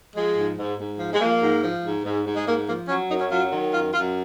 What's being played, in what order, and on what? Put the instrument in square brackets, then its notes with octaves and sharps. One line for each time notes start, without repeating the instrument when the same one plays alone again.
[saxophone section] F3 G#3
G#2
G#2
G#2
F3
G#3
F3 A#3
G#2
F3
G#2
G#2
G#2
G#3
G#2 A#3
F3 A#3
F#3 C#4
F#2 D#4
C#4
F#3 F4
D#3
F#2 F4
F#2 F4